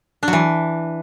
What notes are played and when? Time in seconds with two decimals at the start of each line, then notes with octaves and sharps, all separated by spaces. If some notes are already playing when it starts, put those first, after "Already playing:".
0.23 D4
0.28 F#3
0.33 E3